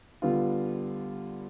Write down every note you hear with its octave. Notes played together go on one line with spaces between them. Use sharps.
D3 G3 B3 F4